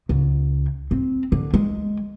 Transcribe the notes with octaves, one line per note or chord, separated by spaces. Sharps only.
C#2
C4
D3
G#3